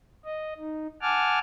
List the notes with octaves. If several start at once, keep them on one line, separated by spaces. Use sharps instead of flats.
D#5
D#4
F#5 G#5 A5 D6 F6